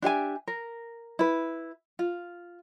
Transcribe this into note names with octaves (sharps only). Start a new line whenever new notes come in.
D4 G4 E5 G#5
A#4
E4 B4
F4